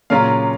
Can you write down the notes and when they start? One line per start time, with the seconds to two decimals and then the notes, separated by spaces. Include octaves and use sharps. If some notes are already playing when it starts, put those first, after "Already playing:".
0.10 A#2 C#3 F#3 C#4 F4 A#4 F5